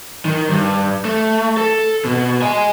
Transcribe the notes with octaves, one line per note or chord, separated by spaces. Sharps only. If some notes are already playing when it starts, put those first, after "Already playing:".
D#3
G2
A3
A4
B2
D#5 G#5